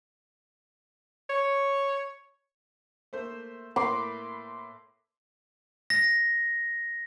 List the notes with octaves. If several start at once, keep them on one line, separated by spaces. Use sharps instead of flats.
C#5
A3 A#3 C5
A2 A#3 B4 C6 D6
A#6